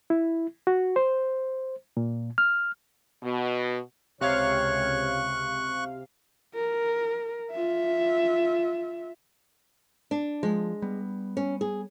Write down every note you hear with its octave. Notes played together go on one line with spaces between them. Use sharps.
E4
F#4
C5
A#2
F6
B2
C#2 C3 C#5 F5 C#6 F#6
A#4
F4 E5
D4
F3 G#3
G3 B3
C#4
G#4